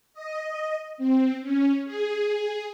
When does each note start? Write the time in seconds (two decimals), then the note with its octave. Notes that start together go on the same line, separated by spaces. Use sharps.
0.14 D#5
0.98 C4
1.42 C#4
1.85 G#4